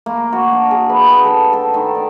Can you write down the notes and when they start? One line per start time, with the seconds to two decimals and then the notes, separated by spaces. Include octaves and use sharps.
0.06 A#3
0.33 F#4
0.52 D4
0.71 G#4
0.89 B4
1.08 G5
1.24 A4
1.53 A4
1.74 D#3
1.95 D5